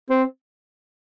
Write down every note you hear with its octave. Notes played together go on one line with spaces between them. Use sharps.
C4